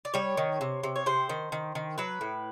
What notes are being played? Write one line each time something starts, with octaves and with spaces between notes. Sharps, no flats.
D5
G3 C#5
D#3
C3
C3
C#5
C3 C5
D#3
D#3
D#3
F#3 B4
A2